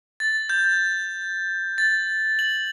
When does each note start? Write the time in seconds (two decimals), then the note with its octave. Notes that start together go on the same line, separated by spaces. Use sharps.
0.20 A6
0.49 G6
1.78 A6
2.39 F#7